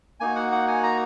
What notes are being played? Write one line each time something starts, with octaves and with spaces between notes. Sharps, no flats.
A#3 D#4 F#4 G#5
F#5
F#5
G#5
A#5